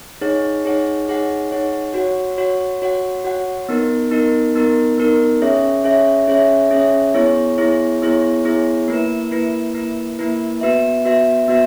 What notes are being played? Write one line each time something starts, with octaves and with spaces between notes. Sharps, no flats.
D#4 G#4 C#5 F#5
D#4 G#4 C#5 F#5
D#4 G#4 C#5 F#5
D#4 G#4 C#5 F#5
F#4 C#5 F#5
F#4 C#5 F#5
F#4 C#5 F#5
F#4 C#5 F#5
B3 D#4 A#4
B3 D#4 A#4
B3 D#4 A#4
B3 D#4 A#4
C#4 G#4 C#5 E5
C#4 G#4 C#5 E5
C#4 G#4 C#5 E5
C#4 G#4 C#5 E5
B3 E4 G#4 C#5
B3 E4 G#4 C#5
B3 E4 G#4 C#5
B3 E4 G#4 C#5
A#3 E4 B4
A#3 E4 B4
A#3 E4 B4
A#3 E4 B4
B3 F#4 B4 E5
B3 F#4 B4 E5
B3 F#4 B4 E5